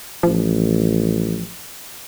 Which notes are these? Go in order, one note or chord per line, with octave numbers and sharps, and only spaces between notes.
A1 F3